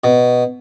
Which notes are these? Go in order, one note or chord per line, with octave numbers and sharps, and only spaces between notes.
B2